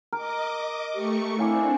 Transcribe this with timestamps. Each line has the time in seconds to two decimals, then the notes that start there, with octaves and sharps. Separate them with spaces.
0.13 A#4 D#5 D6
0.94 A3 G4 C#6 C#7
1.39 C4 D4 E4 F5 G#5 D6